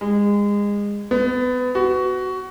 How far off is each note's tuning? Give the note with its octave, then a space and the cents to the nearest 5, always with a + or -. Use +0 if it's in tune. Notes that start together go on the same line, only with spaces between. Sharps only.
G#3 -25
B3 +25
F#4 +15